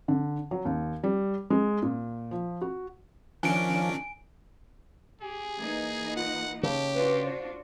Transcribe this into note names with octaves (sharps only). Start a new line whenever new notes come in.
D3
F#3
D#2
G3
G#3
A#2
F3
F#4
D#3 F3 C#4 D4 G#5 D7
G4 G#4 G#5
E3 A#3 D#4 G#6
F4 F#5
C#3 G4 A5
D4 F4 F#4 B4
C5